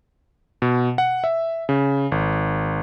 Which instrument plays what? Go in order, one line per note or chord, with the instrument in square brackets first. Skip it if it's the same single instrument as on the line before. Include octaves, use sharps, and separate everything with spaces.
[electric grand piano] B2
F#5
E5
C#3
G#1